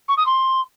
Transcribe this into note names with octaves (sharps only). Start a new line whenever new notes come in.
C#6
D#6
C6